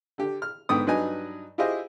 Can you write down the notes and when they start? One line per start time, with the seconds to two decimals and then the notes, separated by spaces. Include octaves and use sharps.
0.18 D3 G4
0.42 F6
0.69 G#2 D3 B3 G5 D#6
0.87 G2 F#3 D#4 B4 D#5 G#5
1.58 E4 F4 G4 G#4 C5 D#5